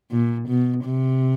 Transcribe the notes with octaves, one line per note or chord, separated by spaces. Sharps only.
A#2
B2
C3